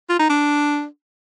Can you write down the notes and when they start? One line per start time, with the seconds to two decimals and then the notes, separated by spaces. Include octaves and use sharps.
0.09 F4
0.20 D#4
0.30 D4